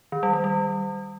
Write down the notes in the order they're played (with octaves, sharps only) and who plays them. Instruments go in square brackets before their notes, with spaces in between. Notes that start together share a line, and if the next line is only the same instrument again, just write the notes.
[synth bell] D#3
G3
G3
G3